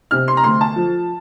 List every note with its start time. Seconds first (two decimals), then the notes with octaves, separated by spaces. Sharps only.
0.11 C3 F6
0.28 C6
0.37 A#5
0.44 D2 C6
0.61 A5
0.76 F3